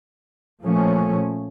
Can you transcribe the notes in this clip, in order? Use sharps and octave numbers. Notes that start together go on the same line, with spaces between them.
A#2 F3 A3 C#4